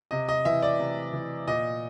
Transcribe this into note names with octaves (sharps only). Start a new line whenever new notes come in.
C3 D#5
D#5
E3 E5
D5
C3
E3
A#2 D#5